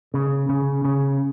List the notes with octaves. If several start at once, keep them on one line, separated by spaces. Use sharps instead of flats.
C#3
C#3
C#3